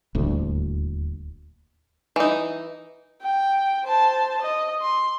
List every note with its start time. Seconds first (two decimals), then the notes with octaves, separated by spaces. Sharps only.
0.15 D#1 D2 A2
2.16 E3 D#4
3.22 G5
3.84 C5 A5
4.42 D#5
4.82 C6